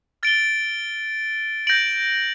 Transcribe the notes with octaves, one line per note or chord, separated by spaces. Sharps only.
F6 A6 D7 G7
G6 A#6 D7 F#7